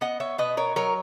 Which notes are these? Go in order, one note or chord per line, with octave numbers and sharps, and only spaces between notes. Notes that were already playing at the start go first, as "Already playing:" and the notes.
B3 D#5 F#5
C#5 E5
B2 B4 D#5
A#4 C#5
F#3 A#4 C#5